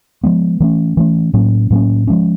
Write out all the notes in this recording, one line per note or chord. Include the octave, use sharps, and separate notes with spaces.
F3 G#3 B3
E3 A3 C#4
E3 A3 C#4
A2 F#3 A#3 C#4
A2 F#3 A#3 C#4
F3 G#3 C#4